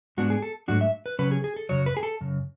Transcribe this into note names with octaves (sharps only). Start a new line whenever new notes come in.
G#2 G#3 B3 D4 F#4
G#4
A4
G#2 F#3 A3 D4 F#4
E5
B4
C#3 F#3 C#4 B4
G#4
G#4
A4
F#2 C#3 F#3 C#5
B4
G#4
A4
F#2 C#3